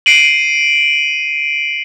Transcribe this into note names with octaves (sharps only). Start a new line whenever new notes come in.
C7 D7 D#7 F#7